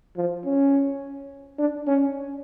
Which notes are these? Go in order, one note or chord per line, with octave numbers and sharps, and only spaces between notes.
F3
C#4
D4
C#4